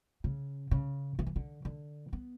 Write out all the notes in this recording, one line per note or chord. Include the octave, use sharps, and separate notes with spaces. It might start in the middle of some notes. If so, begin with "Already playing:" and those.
C#3
C#3
D3
E3
D3
D3
B3